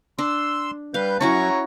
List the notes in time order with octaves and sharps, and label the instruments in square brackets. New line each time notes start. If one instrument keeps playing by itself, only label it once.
[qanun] D4 [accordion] C6 E6
[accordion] G3 B4 G6 [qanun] F5
[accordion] F#2 C#6 [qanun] C#4 E4 F#4 [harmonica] C#5 A#5